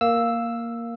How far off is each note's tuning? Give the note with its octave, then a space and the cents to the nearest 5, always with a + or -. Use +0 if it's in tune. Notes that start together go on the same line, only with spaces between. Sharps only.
A#3 +0 F5 +0 E6 +0